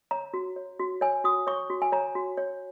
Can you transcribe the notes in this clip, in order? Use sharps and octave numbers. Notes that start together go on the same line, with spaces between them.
C#5 A#5
F#4
C#5
F#4
C#5 G#5
F#4 D#6
C#5 C#6
F#4
G#5
C#5 A#5
F#4
C#5